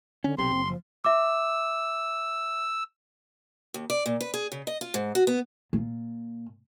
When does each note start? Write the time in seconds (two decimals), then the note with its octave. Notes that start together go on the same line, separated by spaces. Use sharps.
0.24 D3 C#4
0.38 B1 C3 C4 C6
0.51 F#1
0.68 F3
1.05 E5 D6 E6
3.74 D#2
3.90 D5
4.06 A#2
4.21 B4
4.34 G#4
4.52 C#3
4.67 D#5
4.81 F4
4.94 G#2
5.15 F#4
5.27 B3
5.73 A#2